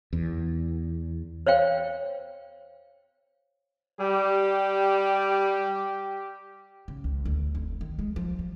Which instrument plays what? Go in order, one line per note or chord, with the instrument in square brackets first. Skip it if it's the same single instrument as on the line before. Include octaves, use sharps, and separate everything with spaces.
[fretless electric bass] E2
[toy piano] C5 C#5 F5 G5
[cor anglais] G3 [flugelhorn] G4
[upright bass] C#3
C#2
D2
F1
D#3
G#3
F3
G3